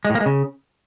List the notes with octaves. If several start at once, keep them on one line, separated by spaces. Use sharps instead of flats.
G#3
A2
A#3
G#3
C#3